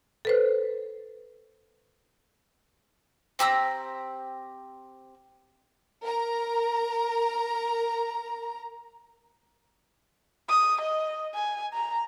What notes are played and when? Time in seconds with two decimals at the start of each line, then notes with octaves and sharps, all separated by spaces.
0.25 A4 B4 C5
3.39 C4 G4 A#5 E6
6.04 A#4 A#5
10.49 D#6
10.81 D#5
11.35 G#5
11.73 A#5